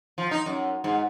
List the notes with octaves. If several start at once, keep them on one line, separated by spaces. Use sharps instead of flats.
F3
D#4
F#2
G#2